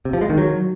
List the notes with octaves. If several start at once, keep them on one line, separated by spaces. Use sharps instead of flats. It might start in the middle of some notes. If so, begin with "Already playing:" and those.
C3
F3
G#3
D#3
F#3